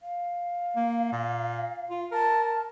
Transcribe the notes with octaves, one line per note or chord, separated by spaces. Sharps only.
F5
A#3
A#2
F4
A#4 A5